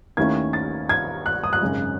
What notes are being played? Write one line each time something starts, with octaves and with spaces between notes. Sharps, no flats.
D#2 D#3 A3 C#4 E4 G#6
A6
G#6
F#6
D#6
F#6
G#1 F#2 C#3 G#3